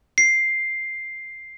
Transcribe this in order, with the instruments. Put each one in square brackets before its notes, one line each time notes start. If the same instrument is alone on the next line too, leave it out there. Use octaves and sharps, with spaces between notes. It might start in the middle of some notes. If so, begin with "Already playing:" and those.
[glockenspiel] C7